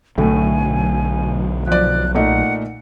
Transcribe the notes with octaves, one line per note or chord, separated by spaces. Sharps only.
B1 A2 D3 F#3 A3 G#5
F3 D5 F#6
A#2 A3 D#4 F#5